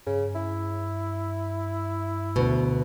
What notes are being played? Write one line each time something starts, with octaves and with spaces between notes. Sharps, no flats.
G2 C#3
E4
D2 B2